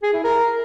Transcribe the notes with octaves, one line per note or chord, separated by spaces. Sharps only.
G#4
E4
A#4